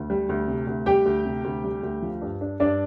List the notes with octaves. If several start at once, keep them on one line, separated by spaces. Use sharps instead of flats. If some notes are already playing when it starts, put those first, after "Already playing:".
Already playing: D2
G3
D2
C3
D2
G3 G4 G5
D2
C3
D2
G3
D2
F3
G2
D4
G2 D4 D5